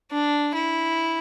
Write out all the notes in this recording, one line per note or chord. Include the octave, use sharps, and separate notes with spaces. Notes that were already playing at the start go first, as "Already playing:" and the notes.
D4
E4